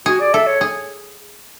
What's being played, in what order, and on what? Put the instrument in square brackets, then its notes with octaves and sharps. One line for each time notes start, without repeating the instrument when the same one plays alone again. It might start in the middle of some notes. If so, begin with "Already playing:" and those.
[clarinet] F#4 [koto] G#4
[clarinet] D5
[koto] A4 [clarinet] E5
[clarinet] C#5
[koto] G#4